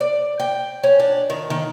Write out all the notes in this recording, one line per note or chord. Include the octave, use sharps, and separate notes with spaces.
D5
G5
C#4
D4
D#3
D#3